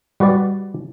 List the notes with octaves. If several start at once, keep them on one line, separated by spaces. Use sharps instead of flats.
G3 F#4 B4 D5